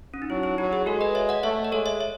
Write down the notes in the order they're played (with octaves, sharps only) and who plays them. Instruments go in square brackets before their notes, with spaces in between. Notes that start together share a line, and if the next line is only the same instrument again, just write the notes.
[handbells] C#4
D#4
[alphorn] F#3 [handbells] E4
[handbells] E4
[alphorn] F#3 [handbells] F#4
[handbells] G#4
[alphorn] G#3 [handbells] F#4 A4
[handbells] B4 D#5
C#5 E5
D#5 F#5
[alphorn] A3 [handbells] C#5 E5
[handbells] D#5
[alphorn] G#3 [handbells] A4 C#5
[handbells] C#5 E5
C#5 E5